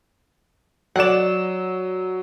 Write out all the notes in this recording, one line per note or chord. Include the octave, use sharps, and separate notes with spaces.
F#3 D5 F#5 E7